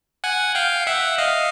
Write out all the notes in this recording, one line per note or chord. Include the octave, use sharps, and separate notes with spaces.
F#5 G#5
F5 G5
E5 F#5
D#5 F5